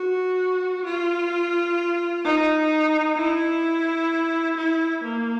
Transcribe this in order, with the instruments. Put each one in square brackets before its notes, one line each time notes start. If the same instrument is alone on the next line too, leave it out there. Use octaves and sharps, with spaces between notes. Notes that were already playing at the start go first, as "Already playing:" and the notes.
Already playing: [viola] F#4
F4
D#4
E4
E4
A#3